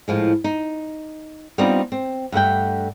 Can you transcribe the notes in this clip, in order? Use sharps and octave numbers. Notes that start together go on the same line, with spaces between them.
A2 F3 G#3
D#4
G3 B3 C4 D4 D#4 F4
C4
G2 A3 F#5 G5